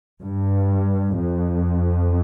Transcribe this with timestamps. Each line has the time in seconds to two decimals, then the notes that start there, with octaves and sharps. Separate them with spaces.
0.21 G2
1.18 F2